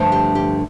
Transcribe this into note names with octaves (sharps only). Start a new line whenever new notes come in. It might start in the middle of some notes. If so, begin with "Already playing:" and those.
Already playing: G2 D3 F3 A3
G4
G4